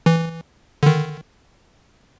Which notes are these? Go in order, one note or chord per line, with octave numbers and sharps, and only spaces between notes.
E3
D3 D#3